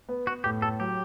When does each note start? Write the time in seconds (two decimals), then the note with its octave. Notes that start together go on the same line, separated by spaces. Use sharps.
0.09 B3
0.27 B3 F#4
0.44 A2 G4
0.62 A2 A4
0.80 F#3 G4